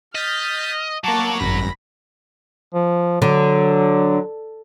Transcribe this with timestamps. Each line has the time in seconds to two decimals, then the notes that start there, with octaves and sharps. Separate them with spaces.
0.15 D#5 F6 G6 A6 B6
1.04 F#3 A#3 A5 C#6 D6
1.40 G#1 F#2 B5 A#6
2.74 F3
3.22 D3 F#3